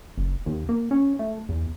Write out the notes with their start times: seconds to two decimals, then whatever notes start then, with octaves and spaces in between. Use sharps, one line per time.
0.17 F#1
0.46 D#2
0.69 A#3
0.91 C#4
1.19 A3
1.49 E2